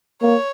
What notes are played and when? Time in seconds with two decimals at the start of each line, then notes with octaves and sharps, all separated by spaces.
0.22 A#3 C#5